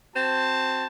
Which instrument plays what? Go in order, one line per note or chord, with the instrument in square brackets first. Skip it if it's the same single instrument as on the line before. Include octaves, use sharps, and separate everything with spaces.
[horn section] C4 F#4 C5 A5